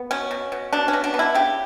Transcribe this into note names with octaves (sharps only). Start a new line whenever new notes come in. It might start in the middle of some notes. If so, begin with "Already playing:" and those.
Already playing: B3
B2 C#4
B2
B2
B2 D4
C#4
B2
D4
B3
E4
C#3 G4